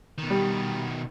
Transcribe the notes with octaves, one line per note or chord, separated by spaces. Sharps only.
B2 D#3
G3